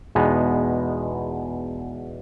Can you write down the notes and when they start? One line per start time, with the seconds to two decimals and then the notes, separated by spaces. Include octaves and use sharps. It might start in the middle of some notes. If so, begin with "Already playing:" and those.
0.15 E2 B2 G#3 B3 D#4